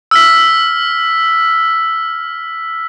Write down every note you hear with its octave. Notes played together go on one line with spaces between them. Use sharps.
E6 F6 B6